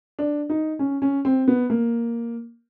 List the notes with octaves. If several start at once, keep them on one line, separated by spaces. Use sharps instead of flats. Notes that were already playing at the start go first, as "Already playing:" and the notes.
D4
D#4
C#4
C#4
C4
B3
A#3